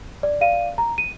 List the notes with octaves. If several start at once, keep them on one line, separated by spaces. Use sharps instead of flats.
D5
D5 F5 D#7
A#5
D#7